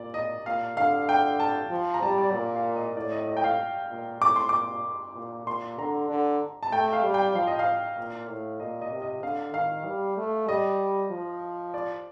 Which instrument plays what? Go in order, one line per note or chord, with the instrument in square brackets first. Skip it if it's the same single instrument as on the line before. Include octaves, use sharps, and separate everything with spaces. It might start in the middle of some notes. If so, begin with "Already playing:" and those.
Already playing: [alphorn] A#2 [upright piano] D5
[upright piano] D#5
[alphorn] A#2 [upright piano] F5
[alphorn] D3 [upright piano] F5
[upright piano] G5
A5
[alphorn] F3
[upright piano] A#5
[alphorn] G3 [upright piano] A5
[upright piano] D5
[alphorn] A#2
[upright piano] F5
D#5
[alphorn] A2 [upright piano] D5
[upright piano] D#5
D#5
G5
F5
[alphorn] A#2
[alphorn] A2 [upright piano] D6
[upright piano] C6
[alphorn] A#2 [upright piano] D6
[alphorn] A#2
[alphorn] A#2 [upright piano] C6
[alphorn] D3 [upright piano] A#5
[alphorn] D3
[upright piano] A5
[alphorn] A3 [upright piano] G5
[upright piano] F5
[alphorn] G3
[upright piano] G5
[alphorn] F3 [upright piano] F5
[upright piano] D#5
F5
[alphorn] A#2
A2
[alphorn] A#2 [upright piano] D#5
[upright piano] D#5
[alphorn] C3
[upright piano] D#5
[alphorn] D3 [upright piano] F5
[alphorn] D#3 [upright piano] F5
[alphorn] G3
A3
[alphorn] G3 [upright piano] D#5
[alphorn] F3
[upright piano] D5